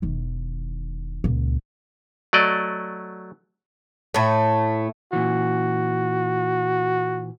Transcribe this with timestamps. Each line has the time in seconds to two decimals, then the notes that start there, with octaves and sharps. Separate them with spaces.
0.02 E1 D#3
1.24 C#2 A#2
2.33 F#3 A3 D5 D#5
4.14 A2 A3
5.13 A#2 E3 F#4